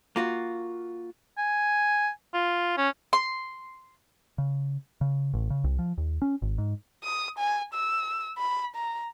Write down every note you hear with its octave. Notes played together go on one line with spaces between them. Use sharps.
A#3 F4 F#4
G#5
F4
C#4
C6
C#3
C#3
A1
C#3
C2
F3
D#2
C#4
G#1
G#2
D#6
G#5
E6
B5
A#5